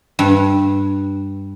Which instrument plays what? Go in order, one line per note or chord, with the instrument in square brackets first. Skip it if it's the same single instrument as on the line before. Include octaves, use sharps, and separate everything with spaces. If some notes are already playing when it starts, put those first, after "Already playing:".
[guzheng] G2